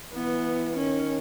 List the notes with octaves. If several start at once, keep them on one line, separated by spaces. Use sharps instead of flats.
E3 B3
D#3 C#4